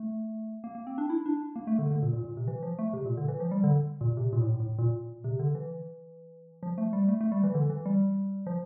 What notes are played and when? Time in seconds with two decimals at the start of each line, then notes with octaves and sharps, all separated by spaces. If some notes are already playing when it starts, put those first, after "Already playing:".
Already playing: A3
0.64 A#3
0.75 A#3
0.87 C4
0.98 D4
1.10 E4
1.26 D4
1.56 A#3
1.67 A3
1.79 D3
1.91 D3
2.02 A#2
2.13 A#2
2.24 A#2
2.37 C3
2.48 E3
2.63 F3
2.79 A3
2.93 C3
3.06 A#2
3.17 D3
3.28 E3
3.40 F3
3.51 G3
3.64 D3
4.01 A#2
4.17 C3
4.33 A#2
4.41 A2
4.60 A2
4.78 A#2
5.24 C3
5.39 D3
5.55 E3
6.63 F3
6.78 A3
6.93 G3
7.09 A3
7.21 A3
7.32 G3
7.44 E3
7.54 D3
7.70 E3
7.86 G3
8.47 F3